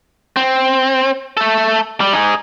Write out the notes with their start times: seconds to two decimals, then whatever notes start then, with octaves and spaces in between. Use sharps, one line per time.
0.36 C4
1.37 A3 A4
2.01 G3
2.13 D#4 G#4